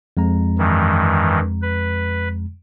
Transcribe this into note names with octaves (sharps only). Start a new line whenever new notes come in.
F2 G#3 A#5
G2 D#3 E3
B4